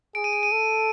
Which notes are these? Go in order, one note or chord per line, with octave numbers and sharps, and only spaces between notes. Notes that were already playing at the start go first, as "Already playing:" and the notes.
G#4 D7
D#7
D7
D#7
A4